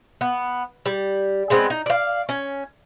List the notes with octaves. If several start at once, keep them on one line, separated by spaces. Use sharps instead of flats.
B3
G3
G#3 B3 C4
D#4
D5 F5
C#4